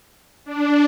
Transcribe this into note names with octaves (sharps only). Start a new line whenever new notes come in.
D4